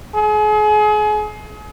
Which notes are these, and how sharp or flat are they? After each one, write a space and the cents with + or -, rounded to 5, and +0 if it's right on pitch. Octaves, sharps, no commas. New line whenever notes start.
G#4 +35